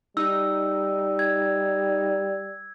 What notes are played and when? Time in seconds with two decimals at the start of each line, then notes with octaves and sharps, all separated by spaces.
0.17 G3 D#4 E6
1.19 G#6